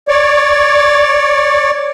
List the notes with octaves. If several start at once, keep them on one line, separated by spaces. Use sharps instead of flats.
C#5 D5